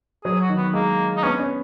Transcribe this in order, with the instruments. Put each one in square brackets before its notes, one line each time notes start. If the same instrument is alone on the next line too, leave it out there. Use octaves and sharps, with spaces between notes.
[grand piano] F#3 [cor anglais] G#4
[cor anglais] F#4
[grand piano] D#3
[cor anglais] B3
[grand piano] G#3 [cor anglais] A#3
[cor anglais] D#4
[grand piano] B3 [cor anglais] C#4
[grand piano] C#4